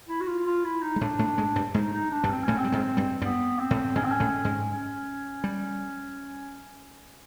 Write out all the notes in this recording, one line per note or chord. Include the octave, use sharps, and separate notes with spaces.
E4
F#4
F4
F4
E4
D#4
G#3
A2 A3 D4
A2 A3
G#2 G#3
G2 G3
G#2 G#3 D#4
D#4
D4
G2 G3
C4
A2 A3 C#4
C4
G3
G#2 G#3
G2 G3
G2 G3 B3
C4
A2 A3
G#2 G#3 C#4
C4
C#4
A2 A3
G#2 G#3
C#4
G3